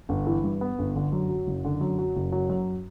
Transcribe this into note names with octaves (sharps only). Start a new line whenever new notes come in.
G1
E3
G2
B3
G1
D3
F#2
F#3
F#1
D3
F#2
F#3
F#1
F#3
F#2